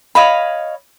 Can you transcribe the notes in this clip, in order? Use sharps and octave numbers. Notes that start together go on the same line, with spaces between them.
C#5 D#5 F5 B5